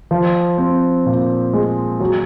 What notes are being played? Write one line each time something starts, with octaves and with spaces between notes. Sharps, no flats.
F3
C4
A#2
G#3
F#3